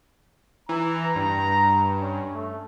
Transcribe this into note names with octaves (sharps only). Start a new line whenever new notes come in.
E3 A#5
G2
C#4
A3